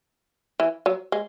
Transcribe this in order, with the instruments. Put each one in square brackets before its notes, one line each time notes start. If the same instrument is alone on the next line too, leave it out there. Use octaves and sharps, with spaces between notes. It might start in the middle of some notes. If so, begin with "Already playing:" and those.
[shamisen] E3
F#3
G#3